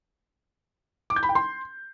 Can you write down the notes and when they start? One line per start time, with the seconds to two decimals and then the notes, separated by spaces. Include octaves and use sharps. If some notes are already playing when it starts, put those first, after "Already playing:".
1.10 D6
1.16 G6
1.23 B5
1.29 G5
1.35 C6